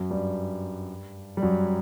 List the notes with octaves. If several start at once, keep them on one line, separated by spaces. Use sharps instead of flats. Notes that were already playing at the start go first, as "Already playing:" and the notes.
Already playing: F#2 F#3
G2 G3
G3
F#2 F#3